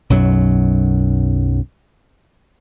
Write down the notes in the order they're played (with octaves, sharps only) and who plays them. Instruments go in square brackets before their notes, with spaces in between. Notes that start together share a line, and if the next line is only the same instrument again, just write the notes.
[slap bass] B1 F#2 F#3